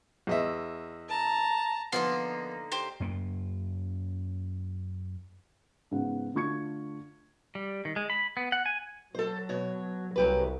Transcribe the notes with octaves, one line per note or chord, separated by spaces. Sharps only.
E2 D#5 E5
A5 A#5
D3 F3 A#3 B3 D#4 C6
G4 C5
F#2 A#3
G#2 C#3 B3 F#5
D3 A3 F4 C#6 G#6 C#7
G3
D#3
G#3
B5
B3
F#5
G#5
F#3 A4 C5
B2 C#5
C2 F#3 G4 B4